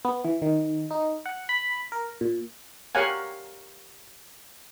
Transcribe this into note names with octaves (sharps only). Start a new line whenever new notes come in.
B3
E3
D#3
D#4
F#5
B5
A#4
A#2
G4 A#4 C#5 F5 F#5 G#5